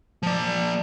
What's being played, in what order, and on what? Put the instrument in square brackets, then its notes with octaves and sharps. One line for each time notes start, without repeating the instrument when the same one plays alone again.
[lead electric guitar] F3 D5